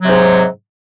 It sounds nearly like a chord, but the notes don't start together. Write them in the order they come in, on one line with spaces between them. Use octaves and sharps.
F#3 C3 G#2